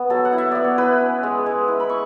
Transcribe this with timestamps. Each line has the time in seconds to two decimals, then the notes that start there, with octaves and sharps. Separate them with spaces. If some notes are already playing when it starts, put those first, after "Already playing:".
Already playing: B3
0.10 F#3 A4
0.25 F#5
0.33 E4
0.38 E5
0.51 B3 D5
0.64 C#5
0.78 E4 B4
1.01 C#4
1.23 G#3
1.46 G#3
1.68 E4
1.80 B5
1.89 C#6